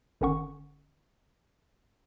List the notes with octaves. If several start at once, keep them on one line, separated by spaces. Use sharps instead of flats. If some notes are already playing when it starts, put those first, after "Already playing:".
G1 D3 D#3 C#4 F#5 C#6